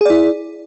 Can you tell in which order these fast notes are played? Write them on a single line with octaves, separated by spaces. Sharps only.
G#4 D5 E4